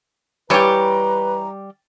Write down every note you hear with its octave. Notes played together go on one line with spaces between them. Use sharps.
E3 G3 G4 B4 C#5 A#5